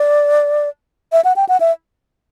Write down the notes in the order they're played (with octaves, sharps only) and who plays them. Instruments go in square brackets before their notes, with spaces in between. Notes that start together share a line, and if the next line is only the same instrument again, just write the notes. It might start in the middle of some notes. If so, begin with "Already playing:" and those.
Already playing: [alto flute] D5
E5
F#5
G5
F#5
E5